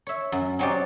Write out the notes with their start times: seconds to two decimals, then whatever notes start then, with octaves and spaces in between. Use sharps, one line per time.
0.07 C#5 E5
0.32 F#2
0.59 F#3 C4 C#4 D#4 G4 D5